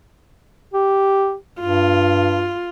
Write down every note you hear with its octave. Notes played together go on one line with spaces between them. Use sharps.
G4
G2 F4